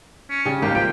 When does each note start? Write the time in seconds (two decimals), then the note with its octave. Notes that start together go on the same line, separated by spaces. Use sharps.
0.30 C#4
0.46 C#3 G3
0.62 G#1 A#3 G4 F5
0.75 F3 G5 D7